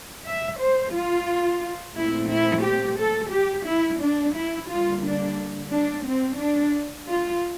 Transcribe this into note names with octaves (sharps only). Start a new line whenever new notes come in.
E5
C5
F4
A#2 A3 C4 E4
E4
G4
A4
G4
E4
D4
E4
D3 G3 A#3 F4
D4
D4
C4
D4
F4